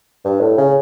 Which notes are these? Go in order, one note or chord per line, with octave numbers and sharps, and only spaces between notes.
G2
A2
C#3